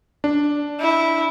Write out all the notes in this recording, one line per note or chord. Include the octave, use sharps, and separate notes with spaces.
D4
E4